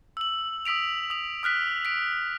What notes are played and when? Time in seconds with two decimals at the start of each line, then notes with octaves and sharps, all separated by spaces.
0.17 E6 F#7
0.65 D#6 E6 B6 D7 F7
1.10 D#6 F7
1.43 D#6 F6 F#6 B6
1.85 B6 D7